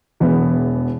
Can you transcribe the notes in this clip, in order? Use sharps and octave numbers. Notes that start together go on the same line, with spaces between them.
E1 E2 E3 B3